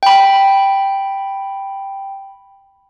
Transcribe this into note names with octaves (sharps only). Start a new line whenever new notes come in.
G5 B5